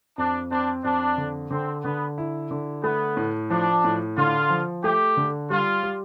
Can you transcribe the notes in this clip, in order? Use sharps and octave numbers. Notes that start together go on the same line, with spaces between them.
F2 D4
C4 D4
F2 D4
D3
D3 C4
D3 B3
E4
D3
A3 B3
A2
F3 D4
A2
D3 F4
F3
A3 G4
D3
G3 F4
G3